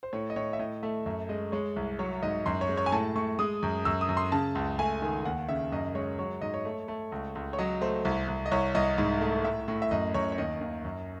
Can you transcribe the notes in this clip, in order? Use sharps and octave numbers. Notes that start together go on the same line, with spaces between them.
C5
A2 C#5
D#5
A2 C#5
E5
A2 D#5
A3 E5
F#2 E5
G#3 D#5
G#3 C#5
C2
F#3 C#5
G#2 D#5
F#2 C6
C#5
G#3
C#5
G#5
A2 A5
A2 C#6
G#3 D#6
F#2
F#2 E6
D#6
F#2
C6
C#3 A5
C#2
A3 G#5
D#3
D#2 F#5
C#3 E5
F#2 D#5
G#3 C#5
F#3 C#5
G#2 D#5
C#5
A3
A3
C#2
C#2
C#5
F#3 D#5
A3 C5
C2
C2
D#5
C2 C#5
C2 D#5
G#2
A3
A2 E5
A2
E5
F#2 D#5
F#2 C#5
C#5
D#2 D#5
D#2
F#2